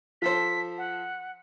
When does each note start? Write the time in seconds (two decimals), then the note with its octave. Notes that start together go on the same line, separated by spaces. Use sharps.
0.22 F3 A4 C5 B6
0.78 F#5